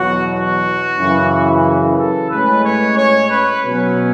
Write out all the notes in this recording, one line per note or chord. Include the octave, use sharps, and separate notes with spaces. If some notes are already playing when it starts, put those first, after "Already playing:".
Already playing: E2 B2 F#3 F#4
F#4
F#2 C#3 E3
A4
A2 G#3 C#4 B4
C#5
C#5
B4
B2 F#3 C#4